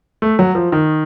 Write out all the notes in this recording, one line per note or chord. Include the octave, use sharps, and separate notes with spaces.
A3
F#3
F3
D#3